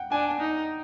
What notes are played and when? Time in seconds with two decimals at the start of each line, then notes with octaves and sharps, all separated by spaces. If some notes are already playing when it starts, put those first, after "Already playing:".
Already playing: F#5 G5
0.11 D4 G#5
0.40 D#4